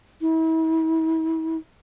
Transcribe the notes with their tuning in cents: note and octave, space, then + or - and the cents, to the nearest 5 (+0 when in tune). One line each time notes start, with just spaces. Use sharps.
E4 -40